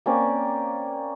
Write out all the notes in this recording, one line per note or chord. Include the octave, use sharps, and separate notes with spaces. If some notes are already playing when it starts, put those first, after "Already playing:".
A#3 C4 C#4 D5